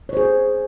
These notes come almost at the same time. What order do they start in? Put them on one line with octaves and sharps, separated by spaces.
C#5 C5 G#4